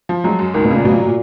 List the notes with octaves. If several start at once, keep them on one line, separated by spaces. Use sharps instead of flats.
F3
F#3 G#3
F#2
C#2 D#3
B2
A#2 C#3
B2 F#3
A#2
A#2